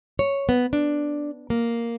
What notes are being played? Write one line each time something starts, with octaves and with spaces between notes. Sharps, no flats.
C#5
B3
D4
A#3